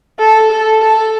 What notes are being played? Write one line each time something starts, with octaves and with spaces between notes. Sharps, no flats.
A4
A4
A4